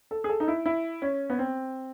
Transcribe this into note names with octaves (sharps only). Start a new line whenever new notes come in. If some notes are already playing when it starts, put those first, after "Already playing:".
A4
G#4
A4
D#4
E4
E4
C#4
B3
C4